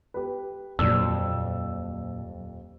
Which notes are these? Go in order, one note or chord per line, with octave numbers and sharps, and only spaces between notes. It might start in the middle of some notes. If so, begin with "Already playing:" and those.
G4 B4
D#1 F2 A#2 F#3 D4 E6